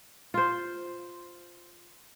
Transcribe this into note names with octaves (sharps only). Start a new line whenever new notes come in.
F4 C5